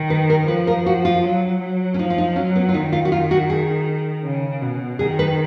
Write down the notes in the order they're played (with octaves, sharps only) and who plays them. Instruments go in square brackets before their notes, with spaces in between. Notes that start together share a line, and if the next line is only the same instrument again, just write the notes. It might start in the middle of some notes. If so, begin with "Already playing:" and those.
Already playing: [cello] D#3
[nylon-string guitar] B4
A#4
[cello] F3 [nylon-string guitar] B4
[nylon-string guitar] A#4
F#4
F4
[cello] F#3
F#3
[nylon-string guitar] C#4
[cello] F3 [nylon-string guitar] D#4
[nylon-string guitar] F4
D#4
[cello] F#3 [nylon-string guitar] C#4
[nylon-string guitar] B3
F4
[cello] D#3 [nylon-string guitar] D#4
[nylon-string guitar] F4
F#4
F4
F#4
G#4
[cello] C#3
B2
[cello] D#3 [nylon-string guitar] G#4
[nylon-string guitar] B4